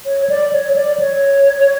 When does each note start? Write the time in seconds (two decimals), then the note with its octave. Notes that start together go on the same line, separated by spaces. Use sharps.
0.06 C#5
0.30 D5
0.53 C#5
0.76 D5
1.00 C#5